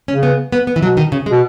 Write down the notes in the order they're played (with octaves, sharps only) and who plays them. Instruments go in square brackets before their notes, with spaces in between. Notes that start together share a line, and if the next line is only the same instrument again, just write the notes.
[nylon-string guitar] C#4
[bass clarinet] C#3
[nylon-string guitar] B3
B3
B3
E3
[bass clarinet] B2 [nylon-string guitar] F#3
[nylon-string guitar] D#3
C#3
G#3
[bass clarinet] B2